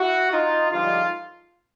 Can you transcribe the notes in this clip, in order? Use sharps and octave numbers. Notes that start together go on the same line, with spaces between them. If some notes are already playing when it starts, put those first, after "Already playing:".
Already playing: E4 F#4
D#4 F4
G2 D3 F3 G#3 D#4 F4